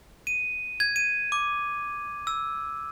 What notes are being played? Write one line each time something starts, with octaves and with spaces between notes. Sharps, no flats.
D#7
G#6
D#7
D6
E6